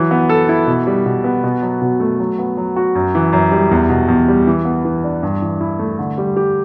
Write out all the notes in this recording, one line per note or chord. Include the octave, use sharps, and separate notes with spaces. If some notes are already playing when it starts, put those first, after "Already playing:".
Already playing: E3 F#3
B3
A4
E4
B2
G3
B2
B3
B2
F#3
B2
A3
F#3
B3
F#3
F#4
F#2
E3
F#2
G3
E2
B2
E2
G3
E3
B3
E3
D4
G2
E3
E4
A3
D3
G3
G4